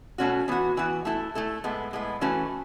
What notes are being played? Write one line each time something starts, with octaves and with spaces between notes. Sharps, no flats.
B2 A3 C#4 F#4
E3 B3 F#4
E3 B3 F#4
A3 E4 A4
A3 E4 A4
A2 G#3 B3
A2 G#3 B3
E3 A3 C#4 F#4 B4